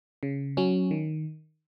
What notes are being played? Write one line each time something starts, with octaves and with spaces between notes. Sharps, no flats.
C#3
F#3 C#4
D#3